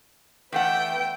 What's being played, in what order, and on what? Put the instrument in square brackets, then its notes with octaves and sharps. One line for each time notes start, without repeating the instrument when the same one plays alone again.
[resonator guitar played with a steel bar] E2 A3 F#5 [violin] B4 G5